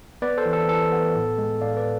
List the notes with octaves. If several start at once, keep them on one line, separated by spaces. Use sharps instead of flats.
B3 B4 D5
A4 C5
E3
A4
E3 A4
B3
A2
G#3
A2 D5 F5
B4 D5